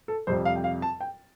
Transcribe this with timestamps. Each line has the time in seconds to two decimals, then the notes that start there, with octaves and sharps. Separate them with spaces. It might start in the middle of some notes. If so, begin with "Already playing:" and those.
0.08 A4
0.27 F2 C3 G3 C5
0.45 F5
0.56 G5
0.64 F5
0.82 A5
1.01 G5